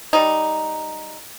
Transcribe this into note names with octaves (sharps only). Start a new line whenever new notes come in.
G3 D#4